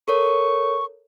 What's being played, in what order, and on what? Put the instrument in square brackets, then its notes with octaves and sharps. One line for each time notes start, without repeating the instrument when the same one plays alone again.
[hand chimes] A4 A#4 C#5 [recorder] C#6